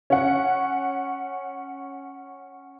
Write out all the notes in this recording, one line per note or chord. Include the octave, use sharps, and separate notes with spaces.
C#4 F#5